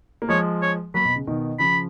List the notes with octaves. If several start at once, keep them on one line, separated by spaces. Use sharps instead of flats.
A#3
F3 G#3 C#5
C#5
F#3 A#3 B5
B2
C#3
B2 D#3
C#3 F3 B5